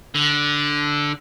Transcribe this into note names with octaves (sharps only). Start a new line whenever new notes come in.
D3